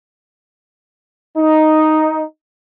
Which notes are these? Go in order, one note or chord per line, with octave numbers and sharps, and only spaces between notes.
D#4